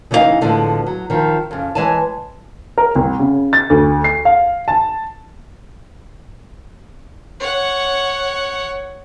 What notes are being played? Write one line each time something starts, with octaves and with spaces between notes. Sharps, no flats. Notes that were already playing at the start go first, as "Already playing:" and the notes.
C#3 E3 D#4 E4 D#5 F5
A2 D3 F3 G#3 B3
F#3
D#3 F3
F2 C#3
E3 G#3 C#5 G#5 A5
A#4
C2
C#3
A6
D2
C7
F5
A5
C#5 F#5